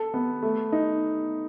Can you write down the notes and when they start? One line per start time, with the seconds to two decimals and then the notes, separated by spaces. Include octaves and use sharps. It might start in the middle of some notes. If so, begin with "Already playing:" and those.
Already playing: A4
0.14 B3
0.42 A3
0.72 D#4